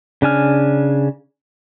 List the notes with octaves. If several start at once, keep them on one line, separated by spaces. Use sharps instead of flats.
C#3 D4 G#5 F6